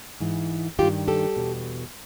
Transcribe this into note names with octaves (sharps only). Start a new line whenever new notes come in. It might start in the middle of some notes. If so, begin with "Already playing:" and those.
G#2 E3
G2 D#3 F4 G4
G4 A4
E2 B2